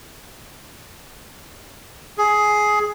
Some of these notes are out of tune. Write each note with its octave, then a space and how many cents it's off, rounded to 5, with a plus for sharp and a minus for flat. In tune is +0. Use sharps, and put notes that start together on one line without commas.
G#4 +15